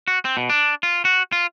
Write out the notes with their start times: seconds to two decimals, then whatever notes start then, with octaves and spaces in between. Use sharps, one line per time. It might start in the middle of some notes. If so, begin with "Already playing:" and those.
0.08 F#4
0.25 C4
0.37 B2
0.50 D4
0.83 F4
1.05 F#4
1.32 F4